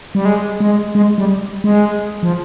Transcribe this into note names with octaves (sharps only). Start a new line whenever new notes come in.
G3
G#3
G#3
G#3
G3
G#3
F3